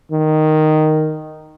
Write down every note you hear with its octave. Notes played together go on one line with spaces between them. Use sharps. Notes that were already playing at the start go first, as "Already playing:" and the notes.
D#3